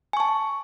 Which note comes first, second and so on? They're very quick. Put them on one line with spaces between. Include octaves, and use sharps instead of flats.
G#5 C#6 A5